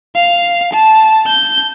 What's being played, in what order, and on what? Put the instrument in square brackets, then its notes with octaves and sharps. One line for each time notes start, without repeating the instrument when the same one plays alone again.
[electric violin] F5
A5
G6